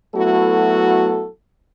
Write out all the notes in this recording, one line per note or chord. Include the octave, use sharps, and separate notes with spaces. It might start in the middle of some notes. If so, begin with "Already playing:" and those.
F#3 A3 B3 E4 F#4 A4